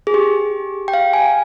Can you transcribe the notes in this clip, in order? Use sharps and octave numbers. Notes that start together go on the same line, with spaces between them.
G#4
G4
G5
F5
G#5